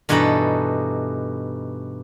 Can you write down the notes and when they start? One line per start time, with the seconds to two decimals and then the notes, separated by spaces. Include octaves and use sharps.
0.09 G2 B2 E3 D#4 A4 B5